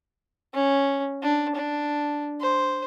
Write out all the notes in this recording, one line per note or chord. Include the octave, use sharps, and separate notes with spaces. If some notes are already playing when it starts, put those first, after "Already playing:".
C#4
D4
D4
C5